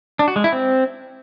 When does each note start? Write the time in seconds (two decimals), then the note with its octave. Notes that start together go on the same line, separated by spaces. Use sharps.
0.19 D4
0.28 F#4
0.36 G#3
0.44 E4
0.52 C4